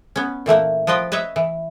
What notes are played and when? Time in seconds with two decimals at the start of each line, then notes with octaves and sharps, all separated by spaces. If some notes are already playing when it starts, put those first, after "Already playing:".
0.16 B3 C#4
0.46 A#2 E3 A3 A#3
0.87 F3 F4 B4 D#5 G5
1.12 B4 C#5 D#5 E5
1.36 E3